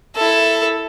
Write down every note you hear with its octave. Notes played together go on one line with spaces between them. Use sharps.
E4 A4